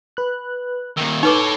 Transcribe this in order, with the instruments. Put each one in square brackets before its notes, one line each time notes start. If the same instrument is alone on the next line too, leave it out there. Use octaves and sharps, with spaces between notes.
[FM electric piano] B4 F#6
[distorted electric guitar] A#2 D#3 [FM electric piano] E6
[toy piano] D#4 B4 D6 [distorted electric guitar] A4 C#5